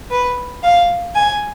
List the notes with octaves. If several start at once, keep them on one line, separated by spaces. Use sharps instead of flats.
B4
F5
G#5